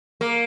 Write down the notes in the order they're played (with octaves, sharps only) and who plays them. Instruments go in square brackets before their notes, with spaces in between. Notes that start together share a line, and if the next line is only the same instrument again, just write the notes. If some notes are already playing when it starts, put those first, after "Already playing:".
[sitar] A#3